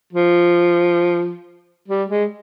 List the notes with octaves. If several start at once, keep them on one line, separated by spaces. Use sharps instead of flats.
F3
G3
G#3